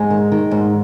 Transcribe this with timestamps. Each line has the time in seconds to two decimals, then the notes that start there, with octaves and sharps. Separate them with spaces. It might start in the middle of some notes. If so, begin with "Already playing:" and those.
Already playing: G#2 G#3
0.11 D#3
0.32 D#3
0.51 G#2